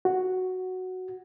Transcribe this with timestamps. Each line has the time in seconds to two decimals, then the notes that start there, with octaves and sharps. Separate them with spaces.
0.05 F#4